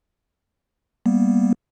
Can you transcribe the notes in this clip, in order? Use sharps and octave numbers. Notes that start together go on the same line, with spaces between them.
G3 A#3 B3